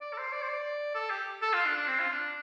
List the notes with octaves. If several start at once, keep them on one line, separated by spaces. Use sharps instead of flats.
D5
A4
C5
D5
C5
D5
A4
G4
A4
F4
D4
D4
C4
F4
D4